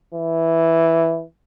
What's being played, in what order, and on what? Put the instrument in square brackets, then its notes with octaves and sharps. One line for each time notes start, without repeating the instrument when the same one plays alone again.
[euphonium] E3